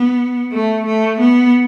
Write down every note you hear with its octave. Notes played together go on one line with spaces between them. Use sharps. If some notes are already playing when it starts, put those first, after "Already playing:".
Already playing: B3
A3
A3
B3